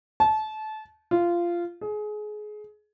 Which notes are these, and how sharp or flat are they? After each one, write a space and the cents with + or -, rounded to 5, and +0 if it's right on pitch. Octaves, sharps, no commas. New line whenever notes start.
A5 -25
F4 -15
G#4 +25